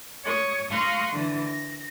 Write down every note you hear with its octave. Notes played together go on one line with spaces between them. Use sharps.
C#5 C#6 D#6
F5 A#5 C6 C#6 D#6 F#6
D3 E3
A#6